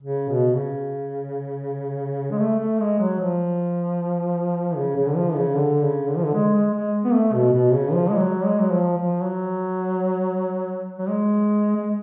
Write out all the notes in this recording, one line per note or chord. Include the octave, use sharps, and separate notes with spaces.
C#3
B2
C#3
G#3
A3
A3
G#3
F#3
F3
C#3
C#3
D3
F3
C#3
D3
C#3
D3
F3
D3
G#3
G#3
G#3
B3
A3
B2
B2
C#3
F3
G#3
F#3
G#3
F#3
F3
F3
F#3
F#3
G#3
G#3